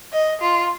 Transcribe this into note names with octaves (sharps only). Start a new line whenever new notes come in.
D#5
F4